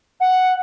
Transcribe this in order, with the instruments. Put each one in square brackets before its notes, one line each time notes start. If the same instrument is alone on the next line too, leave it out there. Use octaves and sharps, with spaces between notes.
[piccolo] F#5